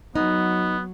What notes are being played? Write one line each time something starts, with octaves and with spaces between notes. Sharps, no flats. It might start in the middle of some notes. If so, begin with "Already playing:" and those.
F#3 B3 D#4